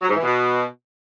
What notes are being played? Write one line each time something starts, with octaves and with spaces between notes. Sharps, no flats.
F#3
G#2
E3
B2